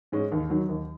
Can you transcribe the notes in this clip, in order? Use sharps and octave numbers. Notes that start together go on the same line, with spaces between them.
G#2 G#3 C#4
D#2
D#3 F#3
D#2